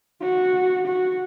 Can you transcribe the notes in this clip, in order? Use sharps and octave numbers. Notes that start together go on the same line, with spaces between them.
F#4
F#4